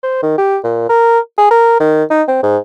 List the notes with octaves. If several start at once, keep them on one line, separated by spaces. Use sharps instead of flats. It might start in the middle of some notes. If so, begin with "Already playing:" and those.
C5
D#3
G4
A#2
A#4
G#4
A#4
D#3
D#4
C4
G#2